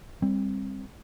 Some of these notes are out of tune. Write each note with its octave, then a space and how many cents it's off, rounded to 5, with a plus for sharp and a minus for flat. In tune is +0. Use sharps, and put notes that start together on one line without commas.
G3 +30 C4 +20